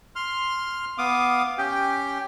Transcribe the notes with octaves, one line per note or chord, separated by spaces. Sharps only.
C6 F6
B3 F5 D6 D#6
C#4 G4 G5